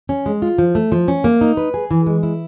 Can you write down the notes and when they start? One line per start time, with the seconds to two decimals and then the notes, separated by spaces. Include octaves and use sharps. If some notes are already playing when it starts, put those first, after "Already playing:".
0.09 C#4
0.26 G#3
0.42 F4
0.58 F3
0.75 A3
0.92 F3
1.08 C#4
1.24 A#3
1.41 D#4
1.57 B4
1.74 G#4
1.91 E3
2.06 G#3
2.23 E4